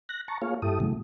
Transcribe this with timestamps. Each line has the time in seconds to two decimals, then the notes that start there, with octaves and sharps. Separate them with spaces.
0.09 F#6 A#6
0.28 A5 A#5 C#6
0.42 A#3 F4 G#4 C#5 F5
0.62 G2 E4 G4 A4 D#6
0.80 A#2 C#3 E3 F#3 G#3 A3